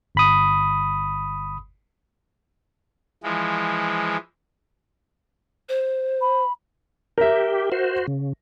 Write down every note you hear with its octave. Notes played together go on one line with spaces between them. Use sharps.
G1 B5 D#6
E3 F3 G#3
C5
B5
G4 A#4 E5
F#4 C5
C#3